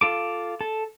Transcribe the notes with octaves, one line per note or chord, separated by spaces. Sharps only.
F4 A4 D6
A4